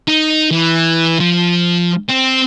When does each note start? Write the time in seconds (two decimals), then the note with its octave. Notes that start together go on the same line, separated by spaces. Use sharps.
0.08 D#4
0.51 E3
1.20 F3
2.09 C4